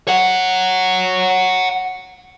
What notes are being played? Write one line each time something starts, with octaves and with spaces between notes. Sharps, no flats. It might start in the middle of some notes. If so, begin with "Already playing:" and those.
C#5 F#5